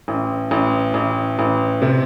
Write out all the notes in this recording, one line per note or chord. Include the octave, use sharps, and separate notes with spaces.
A1
A1
A1
A1
C3